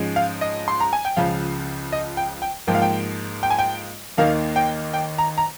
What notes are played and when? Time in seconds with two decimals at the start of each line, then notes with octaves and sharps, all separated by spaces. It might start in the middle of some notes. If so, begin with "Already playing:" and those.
Already playing: G#2 F3 G#3 C#4
0.16 F5
0.41 D#5
0.68 C6
0.80 A#5
0.93 G#5
1.05 G5
1.17 C#2 C#3 F3 F5
1.92 D#5
2.17 G5
2.42 G5
2.67 G#2 F3 A#3 G5
2.75 F5
2.82 G5
3.43 G5
3.50 G#5
3.59 G5
4.17 D#2 D#3 A#3 D#4 F5
4.56 G5
4.93 G5
5.18 A#5
5.38 A#5